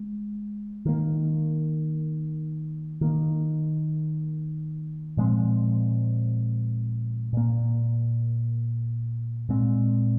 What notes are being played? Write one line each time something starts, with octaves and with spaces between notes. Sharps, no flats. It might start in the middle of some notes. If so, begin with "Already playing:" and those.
Already playing: G#3
D#3 A#3
D#3 A#3
A#2 F3 G#3 C4
A#2 A#3
A#2 G#3 C4